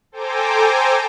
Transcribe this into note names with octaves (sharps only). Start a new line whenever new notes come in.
A4 C5 G5 G#5 A#5 D6